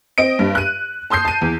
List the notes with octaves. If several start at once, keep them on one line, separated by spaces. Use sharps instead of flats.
C4 D#5 D7
G2
F#6 D#7
A5 C6 D#6 G6 C7
A5 D#7
E2